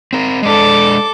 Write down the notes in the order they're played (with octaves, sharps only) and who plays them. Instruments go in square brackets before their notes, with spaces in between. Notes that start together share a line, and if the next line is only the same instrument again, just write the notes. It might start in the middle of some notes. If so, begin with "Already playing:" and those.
[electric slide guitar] C4 A#4
[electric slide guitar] G#3 D4 [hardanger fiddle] A4 D6